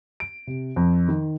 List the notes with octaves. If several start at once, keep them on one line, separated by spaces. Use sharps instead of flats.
D7
C3
F2
D#3